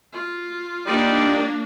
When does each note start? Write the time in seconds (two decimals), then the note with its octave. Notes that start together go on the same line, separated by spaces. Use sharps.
0.12 F4
0.87 G3 A#3 D4 D#4 D5